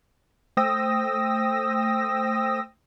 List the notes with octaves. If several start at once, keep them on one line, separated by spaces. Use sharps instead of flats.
A3 C5 G5 D#6 E6 A#6